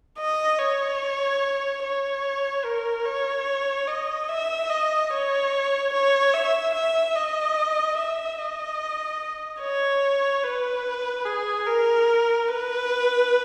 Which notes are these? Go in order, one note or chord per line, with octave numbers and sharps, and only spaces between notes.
D#5
C#5
C#5
A#4
C#5
D#5
E5
D#5
C#5
C#5
E5
E5
D#5
E5
D#5
C#5
B4
G#4
A#4
B4